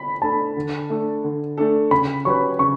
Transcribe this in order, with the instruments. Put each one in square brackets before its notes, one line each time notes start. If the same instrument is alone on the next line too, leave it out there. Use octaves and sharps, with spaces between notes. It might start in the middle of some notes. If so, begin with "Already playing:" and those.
Already playing: [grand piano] B5
[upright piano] A3 D4 A4 [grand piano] A5
[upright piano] D3
A3 D4 A4
D3
A3 D4 A4
[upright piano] C#3 [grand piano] B5
[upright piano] F#3 C#4 G4 B4 [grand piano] C#6
[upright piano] C#3 [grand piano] C#6